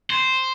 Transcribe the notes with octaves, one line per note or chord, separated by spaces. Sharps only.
C5